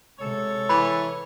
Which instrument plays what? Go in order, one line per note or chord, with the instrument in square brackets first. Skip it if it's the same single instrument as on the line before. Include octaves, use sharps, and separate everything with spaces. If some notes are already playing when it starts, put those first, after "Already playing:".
[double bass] C3 G#3 [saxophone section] A4 C#5
[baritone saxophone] E3 [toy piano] B5